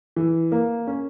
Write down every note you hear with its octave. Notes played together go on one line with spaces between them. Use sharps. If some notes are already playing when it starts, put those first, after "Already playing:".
E3
A#3
C#4